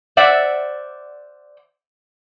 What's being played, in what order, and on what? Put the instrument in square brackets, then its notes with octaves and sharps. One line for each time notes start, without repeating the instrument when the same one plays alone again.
[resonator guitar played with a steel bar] C5 D5 E5 F#5